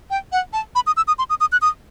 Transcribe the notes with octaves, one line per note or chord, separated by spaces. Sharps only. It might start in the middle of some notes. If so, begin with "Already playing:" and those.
G5
F#5
A5
B5
D#6
E6
D#6
C6
D#6
D#6
F#6
D#6